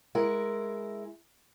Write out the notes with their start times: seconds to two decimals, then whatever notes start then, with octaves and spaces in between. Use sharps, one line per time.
0.15 G#3 E4 A#4